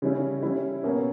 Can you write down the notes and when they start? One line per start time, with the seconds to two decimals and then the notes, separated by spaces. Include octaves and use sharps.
0.02 C#3 G3 C#4 E4
0.43 G3 C#4 E4
0.83 B2 A#3 C#4